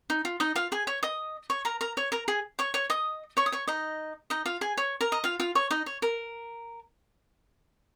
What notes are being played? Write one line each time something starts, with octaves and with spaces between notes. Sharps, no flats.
D#4
F4
D#4 D#5
F4 F5
G#4 G#5
C#5 C#6
D#5 D#6
C#5 C#6
A#4 A#5
A#4 A#5
C#5 C#6
A#4 A#5
G#4 G#5
C#5 C#6
C#5 C#6
D#5 D#6
C#5 C#6
D#6
C#5 C#6
D#4 D#5
D#4 D#5
F4 F5
G#4 G#5
C#5 C#6
A#4 A#5
D#5
F4 F5
F4 F5
C#5 C#6
D#4 D#5
C#5
A#4